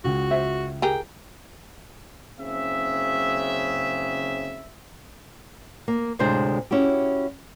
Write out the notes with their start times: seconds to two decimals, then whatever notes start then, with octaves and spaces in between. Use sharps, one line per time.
0.04 C#2 F#4
0.31 C5 E5
0.82 G4 G#4 A#4 G5
2.40 F#1 C#3 C4 E5
5.88 A#3
6.19 D2 A2 C3 G#3 D4 C5
6.71 C#4 E4 F#4 G4